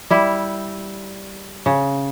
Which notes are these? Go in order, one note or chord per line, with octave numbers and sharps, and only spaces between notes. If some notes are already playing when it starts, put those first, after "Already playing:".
G3 E4
C#3